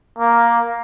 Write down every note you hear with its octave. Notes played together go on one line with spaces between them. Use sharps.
A#3